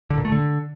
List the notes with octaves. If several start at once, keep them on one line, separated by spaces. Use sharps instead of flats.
D3
A#2
A3
D3